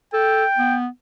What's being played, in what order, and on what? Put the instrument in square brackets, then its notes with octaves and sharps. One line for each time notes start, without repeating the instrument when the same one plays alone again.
[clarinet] A4 [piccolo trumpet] G5
[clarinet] B3